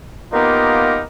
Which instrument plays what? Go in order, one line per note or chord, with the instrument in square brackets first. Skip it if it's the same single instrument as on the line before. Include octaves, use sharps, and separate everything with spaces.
[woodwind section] A#3 B3 D#4 F4 G4 A#4